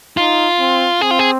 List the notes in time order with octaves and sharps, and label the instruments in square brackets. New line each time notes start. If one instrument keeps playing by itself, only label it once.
[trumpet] D#4 [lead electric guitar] F4
[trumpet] C4
[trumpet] C4 [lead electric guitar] G#4
[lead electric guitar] F4
G#4